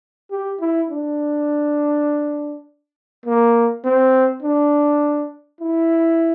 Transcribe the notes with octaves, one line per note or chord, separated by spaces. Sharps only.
G4
E4
D4
A#3
C4
D4
E4